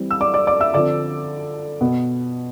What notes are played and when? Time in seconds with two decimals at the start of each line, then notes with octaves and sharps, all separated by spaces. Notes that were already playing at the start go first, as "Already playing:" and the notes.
Already playing: E3 G3 C4
0.11 E6
0.21 D5 D6
0.34 D5 D6
0.47 D5 D6
0.60 E5 E6
0.74 D3 F3 C4 D5 D6
1.81 B2 B3